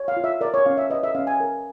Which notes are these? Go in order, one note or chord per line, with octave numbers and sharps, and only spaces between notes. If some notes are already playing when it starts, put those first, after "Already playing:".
Already playing: C#5
F5
F4
E5
A#4 D5
C#5
C#4 F5
E5
B4 D#5
E5
C#4 F5
G#5
A#4